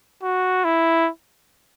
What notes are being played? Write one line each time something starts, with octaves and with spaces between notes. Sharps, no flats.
F#4
E4